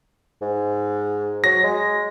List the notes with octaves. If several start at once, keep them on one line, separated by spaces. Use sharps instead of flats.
G#2
F#3 A#6
G#3